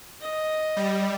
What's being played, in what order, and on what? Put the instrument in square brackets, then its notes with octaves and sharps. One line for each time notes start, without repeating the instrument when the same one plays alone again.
[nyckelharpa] D#5
[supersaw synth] G3